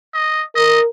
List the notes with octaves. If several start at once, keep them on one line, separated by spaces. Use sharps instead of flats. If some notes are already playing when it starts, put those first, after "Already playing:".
D#5
A#4 D#5